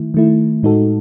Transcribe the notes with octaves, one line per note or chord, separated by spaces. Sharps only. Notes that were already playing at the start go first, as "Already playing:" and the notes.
Already playing: D#3 A3 E4
D#3 A3 E4
A2 G#3 D#4 F#4 A4